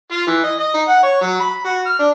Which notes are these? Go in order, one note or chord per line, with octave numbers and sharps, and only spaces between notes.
F4
E3
D#5
D#5
D#4
F#5
C#5
F#3
B5
F#4
F6
D4